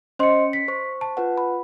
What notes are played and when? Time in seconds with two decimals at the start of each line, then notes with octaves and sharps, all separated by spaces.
0.19 C#4 C5 D#5 C6 C#7
0.53 B6
0.68 C5 C#6
1.01 A5
1.17 F4 B4 F#5
1.38 B5